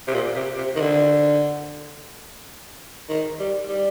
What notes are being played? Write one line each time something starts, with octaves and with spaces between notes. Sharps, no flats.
C3
A#2
C3
C3
D#3
D3
D#3
G3
G3